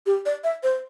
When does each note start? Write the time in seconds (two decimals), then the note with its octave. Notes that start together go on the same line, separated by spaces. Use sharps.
0.06 G4
0.26 D5
0.44 E5
0.63 C5